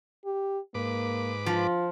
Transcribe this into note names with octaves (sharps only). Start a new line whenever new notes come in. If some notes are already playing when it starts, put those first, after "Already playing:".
G4
G#2 A#3 B4 D6
F3 F4